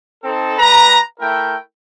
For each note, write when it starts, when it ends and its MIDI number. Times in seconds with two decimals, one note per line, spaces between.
0.23 0.56 60
0.23 0.56 63
0.23 0.56 69
0.58 0.98 55
0.58 0.98 71
0.58 0.98 82
1.20 1.55 57
1.20 1.55 64
1.20 1.55 70
1.20 1.55 79